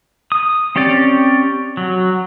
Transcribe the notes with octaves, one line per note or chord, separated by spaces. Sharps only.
D#6
C4 C#4 G4 D5
F#3